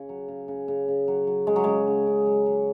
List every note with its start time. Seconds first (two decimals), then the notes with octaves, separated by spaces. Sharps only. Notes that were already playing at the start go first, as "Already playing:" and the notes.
Already playing: C#3
0.09 F#3
0.28 C#3
0.48 C#3
0.68 C#3
0.88 C#3
1.08 F#3
1.27 F#3
1.47 C#3 G#3
1.56 F#3
1.64 C#3 G#3
1.87 C#3
2.07 C#3
2.26 F#3
2.46 F#3